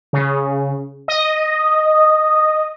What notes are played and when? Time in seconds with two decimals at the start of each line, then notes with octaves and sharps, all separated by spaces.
0.13 C#3
1.08 D#5